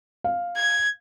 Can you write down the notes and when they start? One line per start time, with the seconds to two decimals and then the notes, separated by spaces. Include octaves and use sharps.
0.24 F5
0.56 G#6